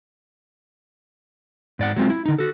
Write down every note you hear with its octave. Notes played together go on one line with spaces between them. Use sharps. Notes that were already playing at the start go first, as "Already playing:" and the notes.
G#2 D5 F#5
F#3 G#3 C4 F4
E4
D3 D#4
F#4 A4